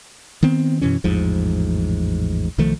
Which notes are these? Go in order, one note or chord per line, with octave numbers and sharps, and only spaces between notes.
D#3 B3 C4
F#2 B2 E3 C#4
A1 E2 G#2 F3
B1 D#3 F3 A3